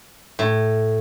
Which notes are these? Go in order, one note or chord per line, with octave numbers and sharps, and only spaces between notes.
A2